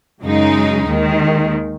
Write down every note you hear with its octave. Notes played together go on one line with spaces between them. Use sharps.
F#2 C#3 G#3 D#4
D#2 D#3 G#3